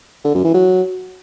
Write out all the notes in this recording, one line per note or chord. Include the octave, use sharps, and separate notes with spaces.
D3
F#2
E3
F#3